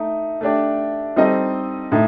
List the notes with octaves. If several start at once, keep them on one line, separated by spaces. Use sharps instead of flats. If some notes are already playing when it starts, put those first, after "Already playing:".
Already playing: A3 D#4
A3 D4 G4 D5
G3 C4 D#4 A4 D#5
A2 A3 D#4